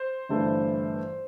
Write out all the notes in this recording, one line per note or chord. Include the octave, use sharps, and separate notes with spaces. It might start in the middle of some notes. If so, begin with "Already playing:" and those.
Already playing: C5
G1 G2 E3 A3 E4